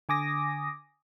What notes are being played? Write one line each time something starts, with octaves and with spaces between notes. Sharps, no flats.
D3 G#5 D6 D#6 A#6